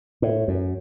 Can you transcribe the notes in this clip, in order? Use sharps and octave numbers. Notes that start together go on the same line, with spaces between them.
A2
F#2